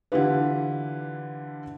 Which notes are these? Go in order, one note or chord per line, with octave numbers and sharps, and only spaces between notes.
D3 E3 E4 F4 G4 B4